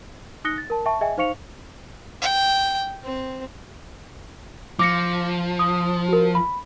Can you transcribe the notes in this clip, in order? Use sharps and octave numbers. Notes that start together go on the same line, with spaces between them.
D#4 D#6 F#6 A#6 C#7 G7
A6
A#4 A5
E5 G5 A5 C#6
G#4 D#5 E5 G5 G#5
D#4 C5 F5 C#6 C#7 F7
G5
C4
F3 D6 A#6 C#7
D#6
F#4 A#4
B5